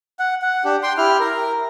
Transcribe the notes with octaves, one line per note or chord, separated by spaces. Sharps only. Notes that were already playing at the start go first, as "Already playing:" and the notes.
F#5
F#5
D4 G4
G5 C6
E4 G4 F6
A#4